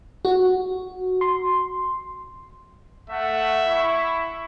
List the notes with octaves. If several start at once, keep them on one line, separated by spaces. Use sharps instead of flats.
F#4
C6
A3 E5 F#5
E4 C#6